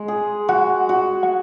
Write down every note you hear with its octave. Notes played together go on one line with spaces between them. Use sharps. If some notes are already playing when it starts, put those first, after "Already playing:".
Already playing: G#3
G#4
F#4 F#5
F#4
F#5